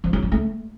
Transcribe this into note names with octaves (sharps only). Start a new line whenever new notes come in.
F3
F#3
C#4
A3